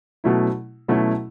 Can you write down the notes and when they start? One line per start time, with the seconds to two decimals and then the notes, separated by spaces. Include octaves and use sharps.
0.24 B2 F#3 A3 C#4 E4
0.88 B2 F#3 A3 C#4 E4